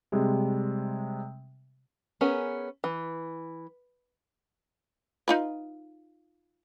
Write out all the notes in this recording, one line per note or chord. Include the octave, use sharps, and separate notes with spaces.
C3 G3 G#3
B3 C#4 G#4 A#4 G#5
E3
D#4 F4 B4